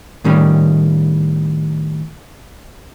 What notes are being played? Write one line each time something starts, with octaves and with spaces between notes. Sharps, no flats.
A2 D#3 G3 C#4